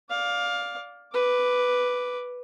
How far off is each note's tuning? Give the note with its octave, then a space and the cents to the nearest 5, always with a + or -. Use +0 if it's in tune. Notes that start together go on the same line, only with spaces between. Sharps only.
D5 -10 F5 +15
B4 +0 D6 +0